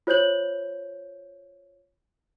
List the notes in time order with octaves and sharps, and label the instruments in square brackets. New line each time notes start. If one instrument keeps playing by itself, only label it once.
[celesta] F4 C5 C#5 G6 F#7